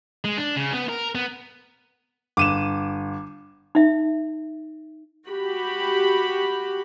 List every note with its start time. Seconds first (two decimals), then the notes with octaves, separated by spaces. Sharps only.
0.25 G#3
0.37 D4
0.56 C#3
0.73 B3
0.89 A#4
1.15 B3
2.37 G1 D6 D#7 E7
3.75 D#4 E5
5.28 F#4 G4 B5